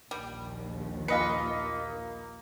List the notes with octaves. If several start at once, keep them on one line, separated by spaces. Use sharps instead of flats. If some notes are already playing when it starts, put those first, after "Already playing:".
A#1 D#2 G3
A#3 F4 B4 D#5 C#7